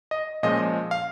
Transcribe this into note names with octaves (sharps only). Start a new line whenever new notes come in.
D#5
A#2 F3 G#3 C#4 D#5
F5